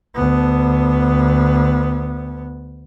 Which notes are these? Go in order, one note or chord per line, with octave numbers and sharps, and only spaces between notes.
D2 B3